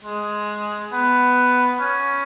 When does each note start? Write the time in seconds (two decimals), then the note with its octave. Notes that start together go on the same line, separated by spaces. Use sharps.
0.04 G#3
0.92 B3
1.80 C#4